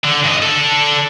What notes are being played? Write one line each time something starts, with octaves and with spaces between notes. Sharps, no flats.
D3
G2 D#5
D4 A4